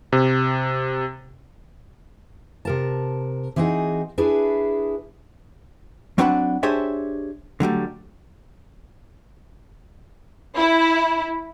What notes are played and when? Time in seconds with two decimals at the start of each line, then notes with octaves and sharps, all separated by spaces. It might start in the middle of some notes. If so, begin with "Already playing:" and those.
0.12 C3
2.65 C3 A#4 A5
3.56 E3 C4 D#4 F#4 G#4
4.18 D4 E4 G#4 B4
6.18 F#3 C4 D4 B4 F#5 B5
6.63 D4 G4 G#4 C5 C#5 E5
7.60 D3 F#3 G3 A3
10.56 E4